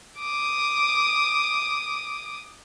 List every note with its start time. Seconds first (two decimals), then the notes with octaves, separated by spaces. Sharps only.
0.20 D6 D#6